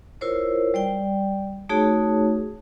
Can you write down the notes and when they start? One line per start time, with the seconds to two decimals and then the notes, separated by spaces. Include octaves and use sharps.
0.21 E4 F4 A#4 C5 C#5
0.74 G3 D5 G5
1.69 A3 D#4 F#4 G#4 C#5 A5